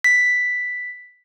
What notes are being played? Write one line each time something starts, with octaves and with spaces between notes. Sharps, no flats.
B6